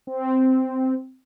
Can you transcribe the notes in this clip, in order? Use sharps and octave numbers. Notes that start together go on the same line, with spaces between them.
C4